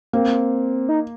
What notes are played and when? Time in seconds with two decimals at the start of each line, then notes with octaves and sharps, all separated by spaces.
0.13 A#3 C4
0.89 D#4